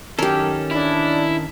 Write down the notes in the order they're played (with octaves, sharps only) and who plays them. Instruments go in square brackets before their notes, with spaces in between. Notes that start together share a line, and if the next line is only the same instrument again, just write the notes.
[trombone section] F#2 [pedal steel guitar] D#3 C#4 A4 [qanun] G4 A#4
[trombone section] A1 D4 [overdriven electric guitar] E4